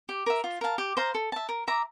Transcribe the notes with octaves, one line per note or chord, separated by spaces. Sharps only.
G4
A#4 E5
F4
A#4 F5 A5
G4
C5 F5 A#5
A4
E5 A5
A#4
E5 A#5 D6